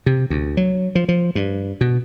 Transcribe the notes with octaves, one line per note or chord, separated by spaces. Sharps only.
C3
D2
F#3
F3
F3
G2
B2